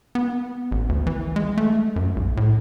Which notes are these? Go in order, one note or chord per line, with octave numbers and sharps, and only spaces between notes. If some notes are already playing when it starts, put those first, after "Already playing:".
B3
A1
D2
E3
G#3
A3
F#2
B1
A2